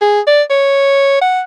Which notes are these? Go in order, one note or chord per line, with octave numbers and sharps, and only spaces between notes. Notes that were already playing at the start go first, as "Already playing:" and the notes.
G#4
D5
C#5
F#5